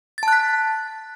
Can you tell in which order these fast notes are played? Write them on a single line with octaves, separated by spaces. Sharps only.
A6 A5 F#6 B6